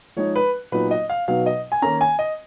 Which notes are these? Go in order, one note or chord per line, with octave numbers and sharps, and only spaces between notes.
F3 G#3 D#4 C#5
B4
A#2 F#3 B3 D#4 B4
D#5
F5
B2 F#3 B3 D#4 F5
D#5
G#5
D#3 A#3 C#4 A#5
G#5
D#5